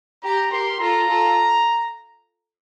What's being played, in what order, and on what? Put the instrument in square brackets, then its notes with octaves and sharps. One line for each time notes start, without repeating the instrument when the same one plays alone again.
[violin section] G4 [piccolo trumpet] A#5
[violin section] G4 A#4 [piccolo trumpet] C6
[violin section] F4 A4 [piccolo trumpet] A#5
[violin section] F4 A4